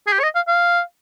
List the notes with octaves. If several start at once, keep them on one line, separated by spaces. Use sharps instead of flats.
G#4
G4
C#5
D#5
F5
F5